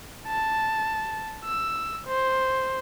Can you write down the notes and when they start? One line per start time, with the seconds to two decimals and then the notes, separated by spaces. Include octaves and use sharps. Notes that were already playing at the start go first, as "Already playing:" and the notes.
0.27 A5
1.45 E6
2.07 C5